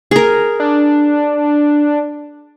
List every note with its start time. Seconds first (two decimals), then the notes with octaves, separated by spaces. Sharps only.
0.11 G#4 A#4
0.60 D4